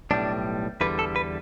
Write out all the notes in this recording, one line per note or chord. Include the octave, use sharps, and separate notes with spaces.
B1 A2 G3 D4
E2 D3 G3 B4
A4
B4